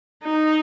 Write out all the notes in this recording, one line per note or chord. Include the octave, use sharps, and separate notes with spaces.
D#4